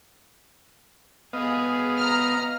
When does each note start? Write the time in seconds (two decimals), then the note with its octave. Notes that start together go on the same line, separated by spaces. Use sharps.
1.33 B3 G#4 D#5 F5
1.98 A#5 F6